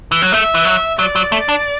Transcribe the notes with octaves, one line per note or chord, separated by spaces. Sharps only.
E3
F#3
A3 E5
E3
F#3
F#3 D5
F#3
A3
D4